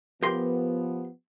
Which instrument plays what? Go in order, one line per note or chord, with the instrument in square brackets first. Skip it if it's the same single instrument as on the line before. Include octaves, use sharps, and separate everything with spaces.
[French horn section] F3 B3 [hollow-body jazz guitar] G4 A#4 C6